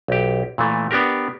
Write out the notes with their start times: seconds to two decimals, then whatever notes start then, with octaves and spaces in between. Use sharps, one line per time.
0.08 B1 G4
0.58 A#2 E3 A3
0.91 B3 D4 G4 A#4